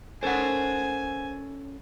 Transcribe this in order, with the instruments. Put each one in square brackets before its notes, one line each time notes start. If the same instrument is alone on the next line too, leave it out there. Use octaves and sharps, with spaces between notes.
[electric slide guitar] C#4 A4 A#4 [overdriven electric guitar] C5 F#5 [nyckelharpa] G#5